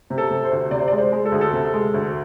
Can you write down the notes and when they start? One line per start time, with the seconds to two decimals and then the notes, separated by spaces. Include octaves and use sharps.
0.10 C3
0.18 A4
0.31 C3
0.45 C5
0.51 D2
0.71 C3 D5
0.79 C5
0.88 G#3 D5
0.98 C5
1.12 G#3
1.25 A4
1.32 D2 G#4
1.41 A4
1.53 C3
1.74 G#3
1.94 D2